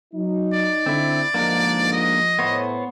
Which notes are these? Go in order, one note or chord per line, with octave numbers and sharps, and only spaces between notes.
F#3 D#4
D5
D3 C4 E4
G1 G#2 F3 A#3 D4 A#4
D#5
A2 B3 C5 C#5